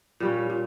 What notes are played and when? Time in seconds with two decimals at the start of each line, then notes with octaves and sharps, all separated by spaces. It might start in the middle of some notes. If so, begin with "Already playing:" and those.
0.20 A#2 G3 C#4
0.50 A#2